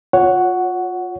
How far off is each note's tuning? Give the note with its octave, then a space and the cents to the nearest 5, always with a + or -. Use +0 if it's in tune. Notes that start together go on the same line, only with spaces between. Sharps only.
F4 +25 C#5 +5 F#5 +0